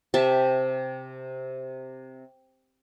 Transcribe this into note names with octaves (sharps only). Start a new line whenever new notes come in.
C3 G4 E5 A5